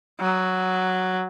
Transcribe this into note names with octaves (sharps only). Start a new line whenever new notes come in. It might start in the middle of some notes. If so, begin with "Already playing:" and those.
F#3